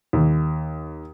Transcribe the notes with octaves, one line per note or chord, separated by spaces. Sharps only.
D#2